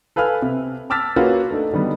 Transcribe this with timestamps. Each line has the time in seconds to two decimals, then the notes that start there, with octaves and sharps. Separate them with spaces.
0.16 A4 B4 F5 G#5 F6
0.42 C3
0.90 A5 D6 E6 F6 A6 B6
1.16 A#3 C#4 F4 F#4 G#4 B4
1.51 A3 D4 D#4 A4
1.73 D3 D#3 G3 B3